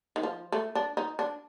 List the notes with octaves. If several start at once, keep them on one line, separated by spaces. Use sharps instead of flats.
D#3
F3
A3
D4
D#4
D4